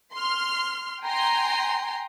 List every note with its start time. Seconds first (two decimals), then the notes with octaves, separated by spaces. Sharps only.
0.15 C6 F6
1.03 G5 G#5 A#5 C6